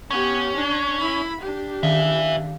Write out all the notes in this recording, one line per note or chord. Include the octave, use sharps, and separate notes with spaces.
B3 C#4 G4
D4
E4 B5
D4 G4
D#3 B4 E5 F5